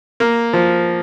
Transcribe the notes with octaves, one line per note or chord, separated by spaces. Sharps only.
A#3
F3